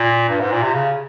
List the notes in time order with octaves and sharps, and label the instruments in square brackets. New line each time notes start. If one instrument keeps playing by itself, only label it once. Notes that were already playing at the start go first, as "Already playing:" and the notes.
Already playing: [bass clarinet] A#2
G2
G#2
A#2
C3
C#3